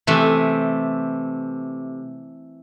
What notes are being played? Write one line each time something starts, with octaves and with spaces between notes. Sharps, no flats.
C3 E3 A3